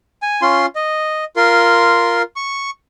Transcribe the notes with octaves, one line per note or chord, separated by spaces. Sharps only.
G#5
C#4 F4 C6
D#5
F4 A#4 C6
C#6